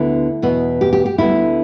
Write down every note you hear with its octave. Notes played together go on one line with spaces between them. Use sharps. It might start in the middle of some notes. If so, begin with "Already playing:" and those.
Already playing: D2 D3 B3 E4
E2 B2 B3
G4
G4
G4
D2 D3 G3 B3 E4